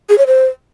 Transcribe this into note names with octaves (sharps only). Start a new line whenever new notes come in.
G#4
C#5
C5